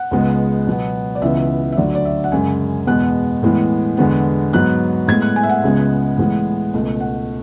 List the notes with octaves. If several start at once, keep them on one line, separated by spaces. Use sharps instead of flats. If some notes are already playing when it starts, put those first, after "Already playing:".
Already playing: F#5
C#2 C#3 G#3 B3
B2 F#3 B3
D5
C#2 C#3 E3 B3 E5
E5
D2 D3 F#3 D5
D5
E5
F#5
F#2 C#3 G#3 G#5
E2 B2 G#3 B3 F#6
A2 E3 G#3 B3
E2 D3 G#3 B3
G#2 F#3 B3 F#6
A2 G#3 B3 G#6
F#6
G#5
E5
F#5
C#2 C#3 G#3 B3
A2 E3 G#3 B3
C#2 B2 A3
F#5